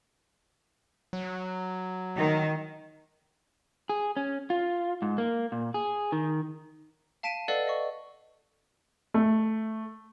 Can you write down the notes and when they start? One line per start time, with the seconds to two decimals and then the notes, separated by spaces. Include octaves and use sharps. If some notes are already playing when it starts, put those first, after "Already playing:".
1.13 F#3
2.17 D#3
3.89 G#4
4.17 C#4
4.50 F4
5.02 G#2
5.18 A#3
5.52 A#2
5.74 G#4
6.12 D#3
7.23 F5 A5 B6 D7 D#7
7.48 A4 B4 D5 D#5 F5 F#5
7.67 D#5 C#6
9.14 A3